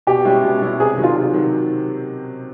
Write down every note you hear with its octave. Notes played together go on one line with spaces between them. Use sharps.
B2 G4
G#3 C#4 E4
B2
G#3 C#4 E4
C3 G#4
D#3 F#3
F4
C3
D#3 F#3